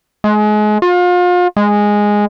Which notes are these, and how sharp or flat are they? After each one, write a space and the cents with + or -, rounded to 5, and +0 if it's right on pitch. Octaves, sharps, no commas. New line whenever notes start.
G#3 +30
F4 +35
G#3 -5